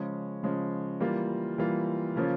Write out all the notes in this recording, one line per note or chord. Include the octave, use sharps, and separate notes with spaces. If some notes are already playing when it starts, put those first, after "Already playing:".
Already playing: C#3 F3 G#3 C#4
C#3 F3 G#3 C#4
E3 G3 A#3 F4
E3 G3 A#3 F4
C#3 F3 A#3 C#4 F4